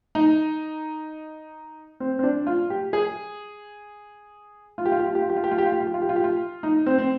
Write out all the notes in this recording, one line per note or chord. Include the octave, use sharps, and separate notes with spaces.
D#4
C4
C4
D4
F4
G4
G#4
F4
G4
F4
G4
F4
G4
F4
G4
F4
G4
F4
G4
F4
G4
F4
G4
F4
G4
F4
G4
F4
D#4
C4
C4